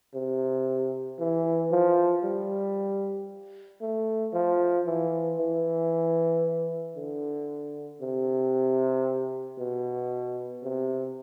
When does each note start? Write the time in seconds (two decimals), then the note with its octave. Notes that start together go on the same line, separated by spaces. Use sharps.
0.14 C3
1.19 E3
1.71 F3
2.24 G3
3.81 A3
4.33 F3
4.86 E3
5.39 E3
6.96 D3
8.01 C3
9.58 B2
10.63 C3